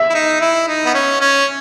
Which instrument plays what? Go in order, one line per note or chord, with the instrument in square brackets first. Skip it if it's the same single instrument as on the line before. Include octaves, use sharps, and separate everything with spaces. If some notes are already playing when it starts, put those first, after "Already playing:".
Already playing: [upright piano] E5
[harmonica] E4
D#4
E4
D#4
B3
C#4
C#4